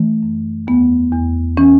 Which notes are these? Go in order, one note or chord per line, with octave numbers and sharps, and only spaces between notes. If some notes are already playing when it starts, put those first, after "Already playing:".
Already playing: E3 A3
F#2
E2 B3
E2
E3 C#4